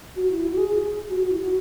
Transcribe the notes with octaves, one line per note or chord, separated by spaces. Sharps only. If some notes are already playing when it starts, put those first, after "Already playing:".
F#4
E4
F#4
G#4
G#4
F#4
F#4
E4
F#4